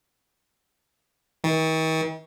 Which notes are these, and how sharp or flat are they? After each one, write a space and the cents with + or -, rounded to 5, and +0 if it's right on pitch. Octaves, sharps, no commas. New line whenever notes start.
D#3 +45